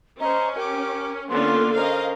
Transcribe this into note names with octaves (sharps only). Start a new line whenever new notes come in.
C#4 C5 D#5 A#5
G4 A#4 D6
D3 A#3 B3 C#4 F4 C6
C#4 A#4 C5 D#5 F5